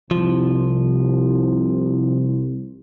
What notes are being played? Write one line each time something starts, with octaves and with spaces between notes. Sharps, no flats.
C2 F3